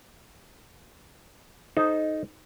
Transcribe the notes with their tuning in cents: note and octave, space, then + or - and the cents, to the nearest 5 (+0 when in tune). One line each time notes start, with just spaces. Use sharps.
D#4 +0 A4 -35 C5 +0